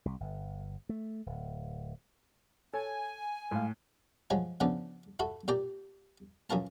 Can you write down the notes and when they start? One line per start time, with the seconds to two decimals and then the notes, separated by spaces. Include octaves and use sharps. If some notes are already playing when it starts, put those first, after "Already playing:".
0.05 C2
0.20 G1
0.89 A3
1.26 D1
2.74 A4 C#5 G#5
3.51 A2 G#3 F5
4.30 F3 F#3 G#3 F4
4.60 C#3 E3 F3 B3 D4
5.19 E4 F#4 A4 E5
5.48 A#2 G4 D5 G5 A#5
6.50 F#2 E3 F4 A#4 A5